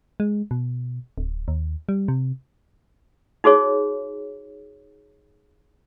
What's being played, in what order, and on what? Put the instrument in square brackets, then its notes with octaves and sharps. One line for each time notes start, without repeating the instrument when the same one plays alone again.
[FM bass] G#3
B2
D1
D#2
G3
C3
[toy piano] D#4 F#4 G#4 C#5